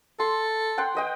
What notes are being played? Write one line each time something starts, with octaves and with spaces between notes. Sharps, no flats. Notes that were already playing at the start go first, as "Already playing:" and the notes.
A4 C6
F#5 G5 C6
B4 D#5 G5